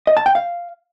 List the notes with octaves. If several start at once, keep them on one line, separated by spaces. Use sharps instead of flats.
D#5
A5
G5
F5